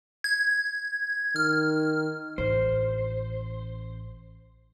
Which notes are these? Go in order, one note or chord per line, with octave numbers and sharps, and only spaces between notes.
G#6
D#3 F6
A1 C5